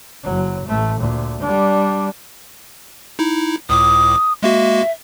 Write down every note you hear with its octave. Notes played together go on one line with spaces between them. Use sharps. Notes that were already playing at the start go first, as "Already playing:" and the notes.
F#1 F#3
A1 A3
D2 A#2
G3 D4
D#4 E4
C#2 A2 D6 D#6
G#3 A#3 F#4 E5